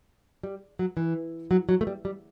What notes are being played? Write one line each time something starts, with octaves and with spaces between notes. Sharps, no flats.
G3
F#3
E3
F#3
F#3
A3
G3
G3